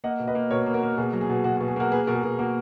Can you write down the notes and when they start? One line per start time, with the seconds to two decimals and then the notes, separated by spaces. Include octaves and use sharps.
0.04 A#3 D#5 F#5
0.19 B2
0.27 B4 D#5
0.35 A#3
0.51 B2 A#4 C#5
0.66 A#3
0.74 F#4 A#4
0.83 A#3
0.97 B2 G#4
1.13 F#3
1.21 G#4
1.30 B2
1.44 B2 F#4
1.57 F#4
1.61 B2
1.68 G#4
1.76 A#3 F#4 A#4
1.92 A#3 G#4 B4
2.07 B2 A#4
2.15 G#4
2.24 B2
2.39 A#3 F#4